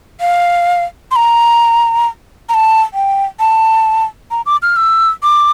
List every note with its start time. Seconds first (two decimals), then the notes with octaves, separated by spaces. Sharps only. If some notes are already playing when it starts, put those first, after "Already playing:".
0.21 F5
1.11 C6
1.16 A#5
2.49 A#5
2.54 A5
2.94 G5
3.40 A5
4.31 A#5
4.46 D6
4.62 F6
4.76 E6
5.23 D6